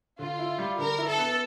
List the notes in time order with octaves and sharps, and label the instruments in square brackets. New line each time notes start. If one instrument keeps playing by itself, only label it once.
[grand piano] D3 [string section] F4
[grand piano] E4
G3
[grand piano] D3 [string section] A#4
[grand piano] E4
[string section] A4
[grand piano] B3